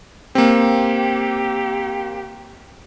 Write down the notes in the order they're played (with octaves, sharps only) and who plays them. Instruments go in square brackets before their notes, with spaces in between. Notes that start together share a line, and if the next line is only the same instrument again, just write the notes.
[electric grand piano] A#3 C4 [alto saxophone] G4